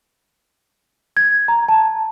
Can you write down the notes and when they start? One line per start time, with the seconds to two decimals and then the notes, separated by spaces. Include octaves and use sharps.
1.17 G#6
1.48 A#5
1.69 A5